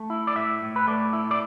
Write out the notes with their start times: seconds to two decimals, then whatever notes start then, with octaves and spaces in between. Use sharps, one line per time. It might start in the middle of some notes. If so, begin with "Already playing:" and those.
Already playing: A3
0.10 E4
0.27 D5
0.36 A2 E5
0.62 A2
0.76 B4
0.87 A3 D5
1.13 E4
1.31 D5